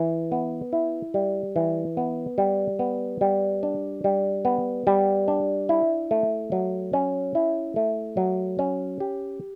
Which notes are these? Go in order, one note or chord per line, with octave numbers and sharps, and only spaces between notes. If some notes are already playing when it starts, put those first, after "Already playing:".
Already playing: E3
B3
E4
G3
E3
B3
G3
B3
G3
D4
G3
B3
G3
D4
E4
A3
F#3
C#4
E4
A3
F#3
C#4
G4